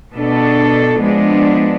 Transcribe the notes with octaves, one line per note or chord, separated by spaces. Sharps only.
B2 B3 D4 A4
F3 G#3 B3 D4